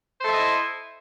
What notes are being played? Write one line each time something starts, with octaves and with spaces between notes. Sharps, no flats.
E4 A4 C5 D#5 E5